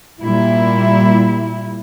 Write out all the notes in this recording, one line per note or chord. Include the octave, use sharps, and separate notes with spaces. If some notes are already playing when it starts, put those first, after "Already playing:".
A#2 G3 E4